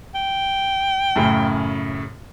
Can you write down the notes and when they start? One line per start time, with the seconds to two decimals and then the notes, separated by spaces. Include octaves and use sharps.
0.15 G5
1.16 F#2 A2 C#3